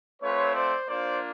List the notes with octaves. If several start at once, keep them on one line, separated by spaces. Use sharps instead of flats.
A3 C4 F4 B4 C#5
C5 D5
A#3 D4 F4 C5 D5